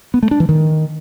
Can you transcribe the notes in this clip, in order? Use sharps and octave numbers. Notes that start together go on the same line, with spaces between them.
B3
A3
D4
E3
D#3